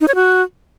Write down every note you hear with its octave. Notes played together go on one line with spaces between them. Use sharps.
D#4
C#5
F#4